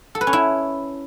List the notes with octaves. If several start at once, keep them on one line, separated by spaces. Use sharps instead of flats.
A4
B4
C#4
E4